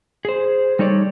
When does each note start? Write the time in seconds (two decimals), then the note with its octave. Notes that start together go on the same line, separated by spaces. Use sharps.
0.25 G#4 C5
0.79 G3 D#4 A4 C#5 D5